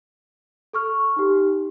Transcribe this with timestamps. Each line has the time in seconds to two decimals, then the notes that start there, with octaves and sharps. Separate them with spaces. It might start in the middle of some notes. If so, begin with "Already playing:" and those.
0.73 A4 C#6 F6
1.16 D#4 G4